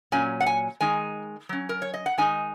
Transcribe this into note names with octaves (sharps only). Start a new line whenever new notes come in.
A#2 F#3 C#4 G#5
F#5
G#5
D#3 G#3 D#4 G#5
F#3 C#4
A#4
C#5
D#5
F#5
D#3 G#3 D#4 G#5